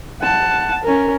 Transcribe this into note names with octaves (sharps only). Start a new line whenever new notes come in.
F#5 A5
C#4 A#4